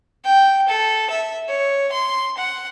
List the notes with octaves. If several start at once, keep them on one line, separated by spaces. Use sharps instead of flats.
G5
A4
E5
C#5
C6
F#5